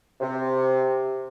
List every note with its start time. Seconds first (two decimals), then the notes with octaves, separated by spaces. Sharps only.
0.21 C3